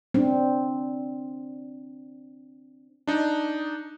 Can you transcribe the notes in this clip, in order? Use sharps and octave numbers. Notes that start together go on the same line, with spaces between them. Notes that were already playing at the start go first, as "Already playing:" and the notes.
C4 D4
D4 D#4